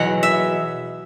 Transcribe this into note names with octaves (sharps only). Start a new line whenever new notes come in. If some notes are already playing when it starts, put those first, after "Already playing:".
Already playing: E2 B2 F#3 F#5
E5